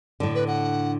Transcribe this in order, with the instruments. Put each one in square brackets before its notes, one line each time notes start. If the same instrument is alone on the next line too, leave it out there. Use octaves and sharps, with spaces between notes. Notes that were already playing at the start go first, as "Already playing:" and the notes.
[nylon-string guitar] A2 D3
[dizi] B4
F#5